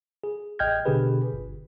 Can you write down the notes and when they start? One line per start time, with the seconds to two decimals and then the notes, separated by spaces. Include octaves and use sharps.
0.24 G#4
0.59 A1 D#5 G5 F6 G6 G#6
0.85 B2 D3 D4 G4 G#4 B4
1.33 G1